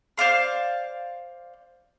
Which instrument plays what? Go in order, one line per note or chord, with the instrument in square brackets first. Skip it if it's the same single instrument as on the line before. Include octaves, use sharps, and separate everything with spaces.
[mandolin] C5 D5 F5 C6